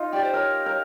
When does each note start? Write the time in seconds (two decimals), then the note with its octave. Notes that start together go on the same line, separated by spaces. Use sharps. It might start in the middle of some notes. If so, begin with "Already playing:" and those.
Already playing: D#4 F4
0.13 G4 D5
0.24 C5
0.34 A#4 C#5
0.66 A#4